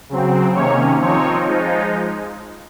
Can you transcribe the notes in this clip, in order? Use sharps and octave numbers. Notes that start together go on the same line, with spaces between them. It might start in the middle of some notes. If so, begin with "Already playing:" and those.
C#3 F#3 C4
C3 D#3 A#3 C#4 C#5
F3 C4 D#4 C#5
F3 G#3 D#4